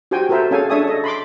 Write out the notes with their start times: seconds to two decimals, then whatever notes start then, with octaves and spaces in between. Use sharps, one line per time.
0.11 F#4 G4 C5 G5 G#5
0.29 F#4 A4 A#4 C5 E5
0.51 C#4 G#4 A4 F5 G#5
0.70 D4 A4 C#5 E5 G#5 D#6
0.87 A4 D#5
1.04 B5 C6 D6